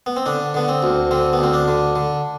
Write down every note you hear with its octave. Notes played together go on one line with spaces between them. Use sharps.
B3
C4
D3 D4
D3 B3
C4
D2
D3 C4
B3
D2 C4
D4
D3
D3